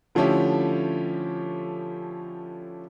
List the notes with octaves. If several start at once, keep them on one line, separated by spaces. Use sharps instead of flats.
D3 F3 A3 C#4 E4 G4